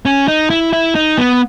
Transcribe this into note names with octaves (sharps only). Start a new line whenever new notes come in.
C#4
D#4
E4
E4
D#4
B3